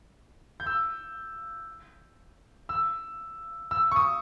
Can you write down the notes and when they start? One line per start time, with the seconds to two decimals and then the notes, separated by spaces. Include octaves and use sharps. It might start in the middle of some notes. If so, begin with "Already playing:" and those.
0.60 G6
0.67 E6
2.69 E6
3.71 E6
3.92 C#6
3.96 D#6